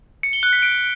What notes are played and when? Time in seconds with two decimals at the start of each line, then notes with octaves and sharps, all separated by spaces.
0.23 C#7
0.33 G7
0.43 F#6
0.53 B6
0.62 D7